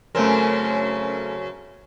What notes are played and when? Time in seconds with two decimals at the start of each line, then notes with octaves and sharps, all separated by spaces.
0.15 F#2 C#3 A3 C4 A#4